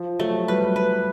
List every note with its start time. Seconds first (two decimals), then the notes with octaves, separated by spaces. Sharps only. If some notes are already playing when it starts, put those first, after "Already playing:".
Already playing: F3
0.19 F#3 A3
0.48 G3 B4
0.76 B4